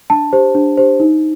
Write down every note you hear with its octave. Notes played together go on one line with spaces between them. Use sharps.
D4 A5
G4 C5
D4
G4 C5
D#4